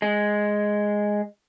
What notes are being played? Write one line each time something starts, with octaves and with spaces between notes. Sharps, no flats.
G#3